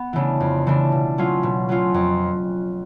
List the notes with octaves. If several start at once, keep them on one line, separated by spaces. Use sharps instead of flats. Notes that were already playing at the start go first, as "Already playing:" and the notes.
Already playing: B3
C#3 E3 A3 D4
F2
C#3 E3 A3 D4
B2
F#3 A3 C#4 F4
B2
F#3 A3 C#4 F4
F2